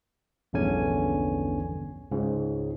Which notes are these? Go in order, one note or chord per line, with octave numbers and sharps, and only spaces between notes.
A#1 E2 G2 D3 C#4 G#5
C#2 G#2 C#3